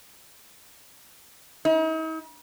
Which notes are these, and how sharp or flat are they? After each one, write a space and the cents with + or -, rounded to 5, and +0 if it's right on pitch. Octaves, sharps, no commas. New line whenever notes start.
D#4 +45